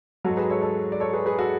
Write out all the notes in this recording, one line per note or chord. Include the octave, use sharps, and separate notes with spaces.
G#2 F#3 F#4 A4
G#4 B4
A4 C#5
A4 C#5
D5
A4 C#5
G#4 B4
G#4 B4
F#4 A4